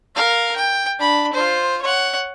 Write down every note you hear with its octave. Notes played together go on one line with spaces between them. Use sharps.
A#4 F5
G5
D4 B5
F4 C5
C#5 F#5